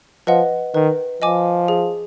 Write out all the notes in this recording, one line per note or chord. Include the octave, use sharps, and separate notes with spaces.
F3 B4 D#5 F#5
D#3 B4
F3 D#5 G#5 D6
G#4